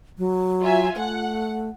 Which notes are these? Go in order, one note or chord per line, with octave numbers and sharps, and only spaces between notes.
F#3
F4 E5 G#5
A3 F#5